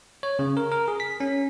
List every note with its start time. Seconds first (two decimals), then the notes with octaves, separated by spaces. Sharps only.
0.23 C#5
0.39 C#3
0.57 A#4
0.72 A#4
0.88 G#4
1.00 B6
1.20 C#4